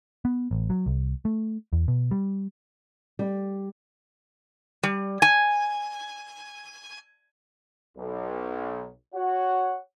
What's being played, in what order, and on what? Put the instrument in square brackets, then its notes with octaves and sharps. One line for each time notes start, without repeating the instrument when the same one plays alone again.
[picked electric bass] B3
A1
F#3
C2
A3
E2
B2
G3
[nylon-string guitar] G3
[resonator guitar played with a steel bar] G3
G#5
[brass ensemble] B1
F#4 C#5 F#5